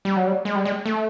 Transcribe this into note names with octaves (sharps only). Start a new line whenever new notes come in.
G3
F#3
G3
G#3
G3
G#3
A3